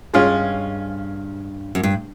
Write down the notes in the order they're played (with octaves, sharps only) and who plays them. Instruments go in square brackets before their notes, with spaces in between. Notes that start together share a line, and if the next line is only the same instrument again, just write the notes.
[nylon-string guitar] G2 [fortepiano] G#3 C#4 F4
[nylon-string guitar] F#2
G2